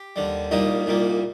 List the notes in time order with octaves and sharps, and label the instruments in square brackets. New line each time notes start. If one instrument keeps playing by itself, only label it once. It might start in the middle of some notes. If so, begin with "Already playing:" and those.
Already playing: [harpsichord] G4
D#2 D3 G3
C2 A#2 G3 A#3 D#4
C2 A#2 G3 A#3